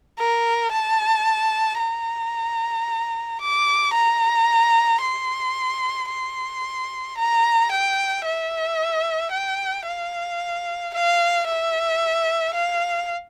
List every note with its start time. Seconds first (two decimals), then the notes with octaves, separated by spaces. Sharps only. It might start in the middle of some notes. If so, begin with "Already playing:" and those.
0.19 A#4
0.72 A5
1.79 A#5
3.41 D6
3.94 A#5
5.02 C6
6.09 C6
7.17 A#5
7.71 G5
8.25 E5
9.32 G5
9.86 F5
10.94 F5
11.47 E5
12.54 F5